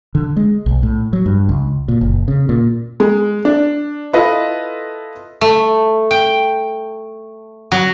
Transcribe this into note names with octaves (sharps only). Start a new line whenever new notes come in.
D3
G#3
B1
A2
F#3
G2
C#2
A#2
F#1
C#3
A#2
G#3
D4
E4 F4 A4 B4 D#5
A3
G5
F#3